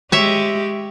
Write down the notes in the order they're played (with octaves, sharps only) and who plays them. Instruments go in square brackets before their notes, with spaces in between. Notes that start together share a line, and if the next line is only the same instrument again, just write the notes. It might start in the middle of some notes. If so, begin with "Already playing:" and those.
[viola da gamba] G#3 G4 [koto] C#5 E5